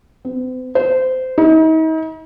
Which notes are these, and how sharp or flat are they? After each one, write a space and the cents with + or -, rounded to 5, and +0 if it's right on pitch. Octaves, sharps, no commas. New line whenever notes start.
C4 -45
C5 -20
D#4 +40